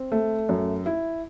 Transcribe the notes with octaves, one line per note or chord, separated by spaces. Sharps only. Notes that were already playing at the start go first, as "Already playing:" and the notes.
Already playing: C4
A3
F#2
E4